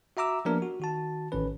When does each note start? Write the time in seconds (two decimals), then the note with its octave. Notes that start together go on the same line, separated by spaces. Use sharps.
0.17 F#4 E5 A#5 D6 E6
0.45 F3 A#3 B3 D4 G4 A#4
0.62 F#4
0.80 D#3 F#4 A5
1.32 A1 D#3 C#4 B4